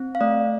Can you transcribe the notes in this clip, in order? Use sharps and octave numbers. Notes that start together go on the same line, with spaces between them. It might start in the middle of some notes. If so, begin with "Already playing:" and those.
Already playing: C4
F5
A3 D5